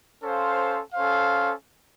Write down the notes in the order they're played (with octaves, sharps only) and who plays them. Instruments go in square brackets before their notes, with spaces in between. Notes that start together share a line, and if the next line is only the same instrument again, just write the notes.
[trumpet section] C#4 A4 C5 F5
C#4 A4 C5 F5